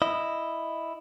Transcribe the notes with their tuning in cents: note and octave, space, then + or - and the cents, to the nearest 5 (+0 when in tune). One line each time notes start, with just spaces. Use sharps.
E4 +0 D#5 -5